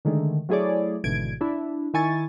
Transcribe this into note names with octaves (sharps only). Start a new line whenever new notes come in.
D3 D#3 G#3 A3
F#3 A3 E4 G#4 C#5 D5
G#1 B2 D3 E3 G#6 D7
D4 E4
D#3 E4 G#5 C#6 A6